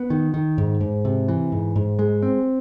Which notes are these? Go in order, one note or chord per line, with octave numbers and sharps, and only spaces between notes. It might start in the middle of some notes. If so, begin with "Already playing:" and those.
Already playing: B3
D#3
D#3
G#2
G#2
C3
E3
G#2
G#2
G#3
C4